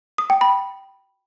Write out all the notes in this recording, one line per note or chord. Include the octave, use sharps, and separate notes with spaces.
D#6
G5
B5